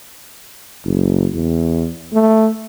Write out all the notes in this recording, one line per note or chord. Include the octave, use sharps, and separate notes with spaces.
F#1
E2
A3